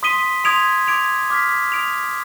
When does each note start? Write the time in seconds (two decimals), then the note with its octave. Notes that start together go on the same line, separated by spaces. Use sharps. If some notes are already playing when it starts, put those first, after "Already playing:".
0.03 C6 D#6 B6 D#7 G7
0.44 C6 D#6 G#6 D7 F7
0.88 D6 G#6 D7 F7
1.30 D6 F6 G#6 B6
1.72 D#6 G#6 D7 F7